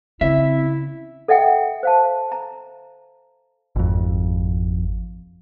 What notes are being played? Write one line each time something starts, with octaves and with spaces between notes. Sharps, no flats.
C#3 C4 E4 E5
A4 D#5 E5 F#5 G5
C5 F5 A5
A#5
G#1 F2